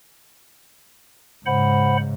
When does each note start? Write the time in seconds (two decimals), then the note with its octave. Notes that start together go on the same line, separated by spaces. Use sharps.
1.46 G#2 C#3 C5 F#5 B5